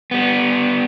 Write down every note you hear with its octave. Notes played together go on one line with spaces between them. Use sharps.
G3 B3